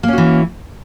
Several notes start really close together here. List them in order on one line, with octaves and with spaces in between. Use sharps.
A#3 C#4 F#4 E3